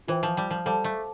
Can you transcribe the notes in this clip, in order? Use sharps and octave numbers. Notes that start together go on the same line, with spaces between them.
E3 F4 C5 G5
F3
G3
F3
G3 A4 C5 F5 A5 D6
A3